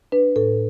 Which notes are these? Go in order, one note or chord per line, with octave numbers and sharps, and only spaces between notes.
D4 B4
A2 A4